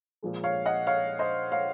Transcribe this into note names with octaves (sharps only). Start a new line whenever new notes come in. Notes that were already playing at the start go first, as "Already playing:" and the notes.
A#2 F3 G#3
C#5 F5
D#5 F#5
C#5 F5
C5 D#5
C#5 F5